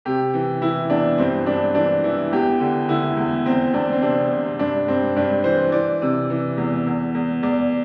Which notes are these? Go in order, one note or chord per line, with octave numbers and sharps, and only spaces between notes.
C3 G4
E3
E3 E4
E2 D4
G2 C4
G2 D4
E3 D4
E3 E4
E2 G4
D3
D3 E4
E2
E2 C4
E2 D4
C4
C3 D4
C3
G2 D4
G2 C4
G2 D4
E3 C5
E3 D5
C3
E3
E2
E2
E2
E2 D5